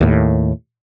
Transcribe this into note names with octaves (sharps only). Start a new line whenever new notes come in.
D#2 A2